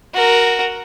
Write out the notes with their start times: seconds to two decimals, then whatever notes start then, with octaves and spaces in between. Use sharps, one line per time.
0.14 F#4 A#4